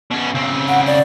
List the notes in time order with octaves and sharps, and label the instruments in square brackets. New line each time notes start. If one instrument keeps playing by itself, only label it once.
[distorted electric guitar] B2 C#4
C#3 C4
[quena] F#5
D5